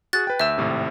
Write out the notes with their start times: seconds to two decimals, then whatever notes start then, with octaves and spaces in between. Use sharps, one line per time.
0.13 F#4 G#4 F#6 A6
0.27 B4 G5
0.40 D2 E5 E6 G6 E7
0.58 G#1 A2 C3